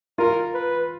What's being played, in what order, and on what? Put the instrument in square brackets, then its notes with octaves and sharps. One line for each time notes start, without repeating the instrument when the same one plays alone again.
[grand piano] F4 [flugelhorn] A#4
[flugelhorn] B4